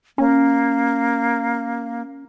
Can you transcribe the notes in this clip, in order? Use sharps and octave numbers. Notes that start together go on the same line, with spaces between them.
A#3 C#4